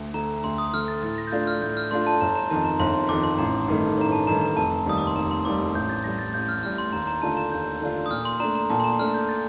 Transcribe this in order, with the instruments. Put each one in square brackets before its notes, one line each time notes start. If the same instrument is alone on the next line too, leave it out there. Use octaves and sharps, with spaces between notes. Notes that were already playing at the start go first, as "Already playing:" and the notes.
Already playing: [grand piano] D2
[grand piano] D3 A3 [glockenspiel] A#5
[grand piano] D2 [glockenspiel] C6
[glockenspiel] D#6
[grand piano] D3 A3 [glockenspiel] F6
[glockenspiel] A6
[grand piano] A2 [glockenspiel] A6
[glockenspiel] A#6
G6
[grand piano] A3 D4 F4 [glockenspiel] A6
[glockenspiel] F6
[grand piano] A2 [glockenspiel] G6
[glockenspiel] F6
[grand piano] A3 D4 F4 [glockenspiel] C6
[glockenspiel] A5
[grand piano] G1 [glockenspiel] A#5
[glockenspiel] A#5
[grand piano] F2 D#3 [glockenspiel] A5
[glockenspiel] A#5
[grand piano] G1 [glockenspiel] C6
[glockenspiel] C6
[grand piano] F2 D#3 [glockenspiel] D6
[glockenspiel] C6
[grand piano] A1 [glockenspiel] A#5
[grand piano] G2 D#3 A3
[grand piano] A1 [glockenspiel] A#5
[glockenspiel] A5
[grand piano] G2 D#3 A3 [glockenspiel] A#5
[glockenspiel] A#5
[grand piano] F1 [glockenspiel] A5
[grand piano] D#2 D#3 G3 [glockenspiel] D#6
[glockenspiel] D6
C6
[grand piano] F1 [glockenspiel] A#5
[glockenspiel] C6
[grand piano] D#2 D#3 G3 [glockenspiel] D6
[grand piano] A1 [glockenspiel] G6
[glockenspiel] A6
[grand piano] A2 G3 [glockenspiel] A#6
[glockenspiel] A6
[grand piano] A1 [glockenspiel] G6
[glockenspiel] F6
[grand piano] A2 G3 [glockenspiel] F6
[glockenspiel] C6
[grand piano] D#2 [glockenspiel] A#5
[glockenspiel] A#5
[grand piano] D3 A3 D4 F4 [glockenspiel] A5
[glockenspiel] A#5
[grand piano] D#2 [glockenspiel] G6
[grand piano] D3 A3 D4 F4
[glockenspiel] D#6
[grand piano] A#2 [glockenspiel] F6
[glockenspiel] C6
[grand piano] A3 D4 [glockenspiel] A#5
[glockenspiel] A#5
[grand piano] A#2 [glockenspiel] A5
[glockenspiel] C6
A#5
[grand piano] A3 D4 [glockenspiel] F6
[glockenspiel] G6
A6